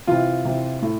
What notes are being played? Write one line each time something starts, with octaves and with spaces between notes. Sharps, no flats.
C3 E3 F4
C3 E3
A2